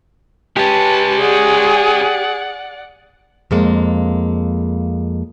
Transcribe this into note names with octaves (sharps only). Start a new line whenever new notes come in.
G#3 C#4 G4 B4 A5
G#4 D5 F#5
F2 G#3 A#3